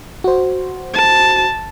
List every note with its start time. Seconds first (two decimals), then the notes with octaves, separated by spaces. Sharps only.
0.24 F#4 C5
0.94 A5